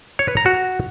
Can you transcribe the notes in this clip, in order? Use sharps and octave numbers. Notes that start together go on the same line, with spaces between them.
C#5
B4
A#5
F#4